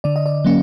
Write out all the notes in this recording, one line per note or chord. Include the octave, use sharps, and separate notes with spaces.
D3 D5
D#5
D5
F#3 A#3 C#4